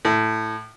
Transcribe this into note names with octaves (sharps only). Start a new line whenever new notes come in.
A2